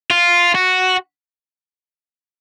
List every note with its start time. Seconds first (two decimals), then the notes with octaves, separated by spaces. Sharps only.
0.11 F4
0.55 F#4